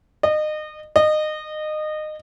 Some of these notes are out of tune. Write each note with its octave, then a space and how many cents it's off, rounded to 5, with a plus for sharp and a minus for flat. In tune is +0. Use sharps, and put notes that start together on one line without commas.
D#5 -30
D#5 -25